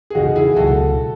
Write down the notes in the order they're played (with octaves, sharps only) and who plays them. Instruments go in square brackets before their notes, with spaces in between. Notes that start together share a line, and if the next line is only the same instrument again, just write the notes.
[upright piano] G#4
[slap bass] E2 C#3 E3 [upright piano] D#4 F#4
[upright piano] E4 G#4
[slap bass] C#2 B2 F#3 [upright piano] F#4 A4